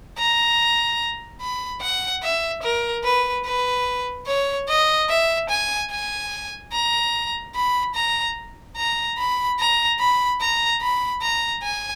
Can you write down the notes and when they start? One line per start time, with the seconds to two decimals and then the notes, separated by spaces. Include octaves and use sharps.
0.18 A#5
1.41 B5
1.81 F#5
2.23 E5
2.63 A#4
3.04 B4
3.45 B4
4.27 C#5
4.68 D#5
5.09 E5
5.49 G#5
5.91 G#5
6.72 A#5
7.55 B5
7.95 A#5
8.77 A#5
9.18 B5
9.59 A#5
9.99 B5
10.40 A#5
10.81 B5
11.22 A#5
11.63 G#5